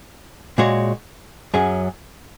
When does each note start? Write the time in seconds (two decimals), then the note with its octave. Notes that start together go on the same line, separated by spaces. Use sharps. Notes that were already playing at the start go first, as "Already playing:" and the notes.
0.58 A#2 G#3 F#4 C#5
1.54 F#2 F#3 C#4 G#4